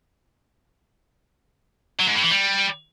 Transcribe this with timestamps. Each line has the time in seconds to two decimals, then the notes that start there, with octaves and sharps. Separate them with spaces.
2.00 F#3
2.08 G#2
2.15 A2
2.23 E3
2.31 G3